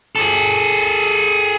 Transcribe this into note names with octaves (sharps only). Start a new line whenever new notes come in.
G#4 A4